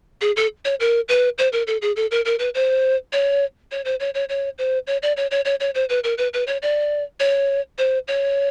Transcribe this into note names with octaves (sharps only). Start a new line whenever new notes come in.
G#4
A4
C#5
A#4
B4
C5
A#4
A4
G#4
A4
A#4
A#4
B4
C5
C#5
C#5
C5
C#5
C#5
C#5
C5
C#5
D5
C#5
C#5
C#5
C#5
C5
B4
A#4
B4
B4
C#5
D5
C#5
C5
C#5